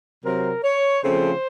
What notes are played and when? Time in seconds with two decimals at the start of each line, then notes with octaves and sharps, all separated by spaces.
0.24 C3 F#3 C4 A#4
0.64 C#5
1.03 C#3 F3 A3 C4 C5